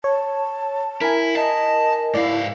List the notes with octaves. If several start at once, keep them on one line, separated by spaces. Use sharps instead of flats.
C#5 A5
E4 A#4 G#5
D#5 A5
G#2 E4 D5 F5